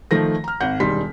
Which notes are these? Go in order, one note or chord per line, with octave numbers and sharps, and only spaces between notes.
D#3 F3 A3 A#6
A#5 F6
G#1 F#5 G6
E1 D#3 G3 C6 B6